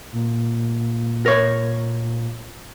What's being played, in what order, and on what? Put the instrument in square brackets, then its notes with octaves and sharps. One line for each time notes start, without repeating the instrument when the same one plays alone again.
[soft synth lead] A#2
[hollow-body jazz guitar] A#4 C#5